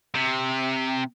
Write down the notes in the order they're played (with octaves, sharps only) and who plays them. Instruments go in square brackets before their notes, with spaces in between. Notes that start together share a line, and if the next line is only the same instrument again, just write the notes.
[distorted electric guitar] C3